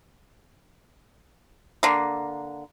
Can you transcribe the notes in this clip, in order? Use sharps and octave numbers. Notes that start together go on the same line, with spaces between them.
D3 A#3